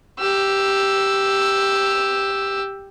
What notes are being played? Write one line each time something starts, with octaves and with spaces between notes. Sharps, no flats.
G4 E6